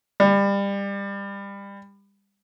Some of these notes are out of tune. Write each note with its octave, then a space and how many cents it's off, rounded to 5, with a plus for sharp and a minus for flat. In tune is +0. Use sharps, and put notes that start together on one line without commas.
G3 +25